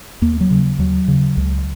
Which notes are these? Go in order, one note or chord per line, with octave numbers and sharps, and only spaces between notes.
D#2 A#3
F#3
C#3
D#2 F#3
C#3
C#2